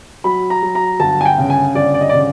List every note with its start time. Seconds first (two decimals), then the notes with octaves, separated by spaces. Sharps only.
0.24 F#3 B5
0.50 A#5
0.63 F#3
0.75 A#5
1.00 G1 A5
1.21 G#5
1.25 G5
1.38 C#3
1.50 G#5
1.75 G1 D5
1.94 D5
2.01 D#5
2.09 D5
2.13 C#3